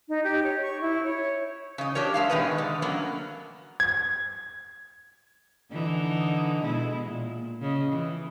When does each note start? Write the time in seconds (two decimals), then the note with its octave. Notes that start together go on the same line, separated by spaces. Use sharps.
0.09 D#4
0.24 G4
0.43 C#5
0.61 C#6
0.81 E4
1.04 C#5
1.78 C#3 D#5
1.95 D4 G4 A#4 C#5
2.14 G#3 E5 F5
2.30 B2 D#3 G#3 D#4 B4
2.58 D3
2.82 F#3 A#3 B3 C#4
3.80 G#6
5.71 D3 E3 D#4
6.63 B2 G#3 E4
7.05 A#2
7.61 C#3 D#5
7.93 E3